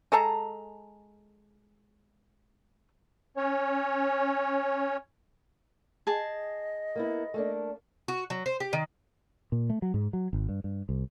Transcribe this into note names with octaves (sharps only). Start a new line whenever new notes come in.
G#3 A4 A5 A#5
C#4 C#5
G#4 D#5 A5
A#3 B3 E4
A3 A#3 D4
F#4
F#3
C5
G4
D#3
A#2
A3
F#3
G#2
F#3
G#1
G2
G2
C2